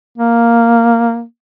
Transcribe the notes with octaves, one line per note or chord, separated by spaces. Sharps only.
A#3